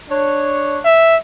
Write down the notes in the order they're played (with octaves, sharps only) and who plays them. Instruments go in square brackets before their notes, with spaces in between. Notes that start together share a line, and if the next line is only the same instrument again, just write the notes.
[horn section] D4 C#5
[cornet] E5